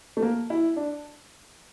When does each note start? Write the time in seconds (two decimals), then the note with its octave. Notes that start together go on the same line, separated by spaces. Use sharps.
0.17 A3
0.22 A#3
0.50 E4
0.76 D4